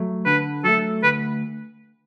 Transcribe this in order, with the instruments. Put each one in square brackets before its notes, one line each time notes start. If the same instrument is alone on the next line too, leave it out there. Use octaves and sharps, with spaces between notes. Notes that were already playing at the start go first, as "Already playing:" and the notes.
Already playing: [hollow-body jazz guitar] F#3 A3
[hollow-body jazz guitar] D3 [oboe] B4
[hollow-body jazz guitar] F#3 A3 [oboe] A4
[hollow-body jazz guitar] D2 [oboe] B4